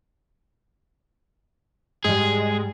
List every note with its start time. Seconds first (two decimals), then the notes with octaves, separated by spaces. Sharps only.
2.04 G#2 G3 G#3 G#4